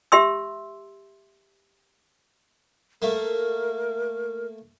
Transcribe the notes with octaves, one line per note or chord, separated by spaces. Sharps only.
G4 E5 C6 E6
A3 A#3 A#4